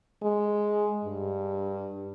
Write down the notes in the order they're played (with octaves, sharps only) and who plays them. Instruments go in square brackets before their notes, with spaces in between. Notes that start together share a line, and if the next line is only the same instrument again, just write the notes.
[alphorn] G#3
G2